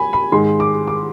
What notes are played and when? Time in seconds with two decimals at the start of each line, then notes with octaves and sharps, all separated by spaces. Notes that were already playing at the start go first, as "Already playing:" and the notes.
Already playing: G#5 B5
0.13 B5
0.32 G#2 D#3 G#3 C6
0.60 D6
0.87 D6